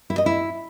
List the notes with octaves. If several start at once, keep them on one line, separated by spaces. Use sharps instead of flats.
E4
D#5
E4